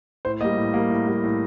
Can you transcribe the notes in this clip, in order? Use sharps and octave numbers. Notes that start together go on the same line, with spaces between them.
A2 C5
G3 A#3 D#5
A2
G3 A#3
A2
G3 A#3
A2